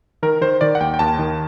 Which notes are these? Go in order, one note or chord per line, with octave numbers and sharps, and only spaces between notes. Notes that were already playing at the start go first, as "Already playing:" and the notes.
D#3 A#4
D#3 C5
D#3 D5
F#5
D#2 G5
G5
D#2 A5
D#3